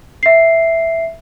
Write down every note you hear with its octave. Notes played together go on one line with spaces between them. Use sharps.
E5 C7